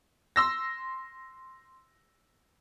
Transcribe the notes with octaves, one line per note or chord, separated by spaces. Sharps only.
C6 E6 A#6